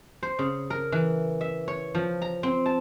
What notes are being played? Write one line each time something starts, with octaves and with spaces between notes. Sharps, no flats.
C5
C#3
A#4
E3
E5
C#5
F3
A#5
C4
A5